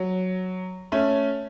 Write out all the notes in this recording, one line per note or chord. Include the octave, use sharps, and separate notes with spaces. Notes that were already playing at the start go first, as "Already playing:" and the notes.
Already playing: F#3
A3 C#4